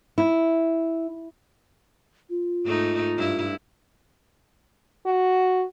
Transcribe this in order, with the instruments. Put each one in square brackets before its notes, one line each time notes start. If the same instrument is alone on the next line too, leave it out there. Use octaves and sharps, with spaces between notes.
[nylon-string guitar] E4
[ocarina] F4
[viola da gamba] G#2 A3 D#4
G2 E4
[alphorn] F#4